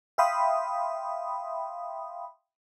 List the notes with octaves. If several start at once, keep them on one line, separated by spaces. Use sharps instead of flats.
E5 F5 G5 B5 C6 D#6